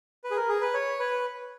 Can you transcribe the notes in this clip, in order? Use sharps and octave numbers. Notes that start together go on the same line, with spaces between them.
B4
G#4
A#4
G#4
B4
C#5
B4